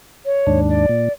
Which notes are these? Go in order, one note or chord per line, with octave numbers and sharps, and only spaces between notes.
C#5
D#2 G#2 D4
D5
A#2